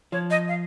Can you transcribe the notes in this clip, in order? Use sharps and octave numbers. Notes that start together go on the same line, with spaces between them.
F3 C#5
D#5
F5